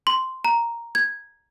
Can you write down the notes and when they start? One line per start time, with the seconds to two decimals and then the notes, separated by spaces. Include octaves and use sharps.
0.07 C6
0.45 A#5
0.95 G#6